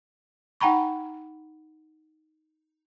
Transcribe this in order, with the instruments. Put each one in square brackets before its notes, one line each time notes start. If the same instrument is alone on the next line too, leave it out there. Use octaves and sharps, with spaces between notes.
[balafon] D#4 F#5 G5 A#5 B5 C#6